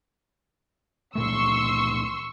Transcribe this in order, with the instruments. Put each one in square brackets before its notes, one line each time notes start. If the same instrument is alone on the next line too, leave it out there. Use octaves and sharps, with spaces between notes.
[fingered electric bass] C#2 A#2 A3 [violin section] C6 C#6 E6